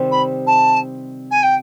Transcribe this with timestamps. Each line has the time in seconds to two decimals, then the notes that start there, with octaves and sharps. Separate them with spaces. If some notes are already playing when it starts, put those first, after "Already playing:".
Already playing: C3 D#3 G3 C4 D#4
0.11 B5
0.46 A5
1.31 G#5
1.42 G5